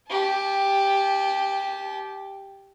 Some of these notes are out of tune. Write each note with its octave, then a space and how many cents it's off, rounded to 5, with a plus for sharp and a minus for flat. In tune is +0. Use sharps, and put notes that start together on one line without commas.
G4 +5 A5 -40